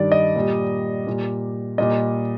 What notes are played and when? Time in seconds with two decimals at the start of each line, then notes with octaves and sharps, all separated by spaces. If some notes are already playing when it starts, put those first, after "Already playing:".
Already playing: G2 D#3 G3 D5
0.12 D#5
0.36 A#2 G3
1.07 A#2 G3
1.78 A#2 G3 D#5